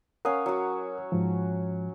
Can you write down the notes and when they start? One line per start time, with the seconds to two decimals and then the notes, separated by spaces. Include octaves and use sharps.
0.25 C#4 A#4 F5 F#5 D#6
0.46 F#3 F#4
1.12 G#2 F3